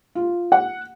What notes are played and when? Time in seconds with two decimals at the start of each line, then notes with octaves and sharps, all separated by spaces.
0.15 F4
0.52 F#5